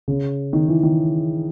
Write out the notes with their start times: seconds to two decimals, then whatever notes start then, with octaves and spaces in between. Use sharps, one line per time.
0.08 C#3
0.53 D#3
0.68 E3
0.83 D#3